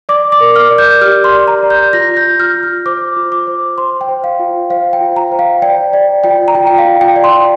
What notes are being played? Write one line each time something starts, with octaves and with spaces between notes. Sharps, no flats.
D5 D6
D6
A#4
F6
D5
G6
G4 F6
C6
D5
A#5
D5
G6
F4 A#6
G6
F4
F6
F4
F6
C5 D6
F4
D6
C5
C5 C6
G5
C5
F5
F4
C5 F5
G5
F4
A#5
C5
F5
D5 G5
D5
F4 G5
A#5
F4 G5
G5
F5
F4
G5
D5
C6